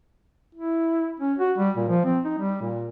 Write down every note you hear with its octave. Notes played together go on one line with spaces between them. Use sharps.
E4
C#4
F#4
G3
A#2
F3
C4
D#4
G3
A#2